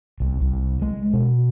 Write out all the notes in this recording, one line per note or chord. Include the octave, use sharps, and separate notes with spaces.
C2
C2
G#3
B2